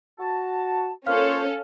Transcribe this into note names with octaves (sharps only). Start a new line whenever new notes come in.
F#4 A5
A#3 C#4 F4 A4 C5 C#5 F5 F6